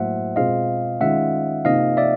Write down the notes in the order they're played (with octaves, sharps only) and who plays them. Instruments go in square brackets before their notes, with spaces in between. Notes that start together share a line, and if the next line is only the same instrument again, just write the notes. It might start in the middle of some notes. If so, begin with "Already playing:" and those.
Already playing: [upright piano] A2 F#3 A#3 [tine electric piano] C5 E5 F#5
[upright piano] B2 G#3 C4 F4 G#4 [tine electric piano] D#5 F5
[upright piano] D#3 G#3 C#4 F4 [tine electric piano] E5 F#5
[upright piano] C3 F3 A#3 D#4 [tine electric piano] D#5 F5
[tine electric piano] D5 E5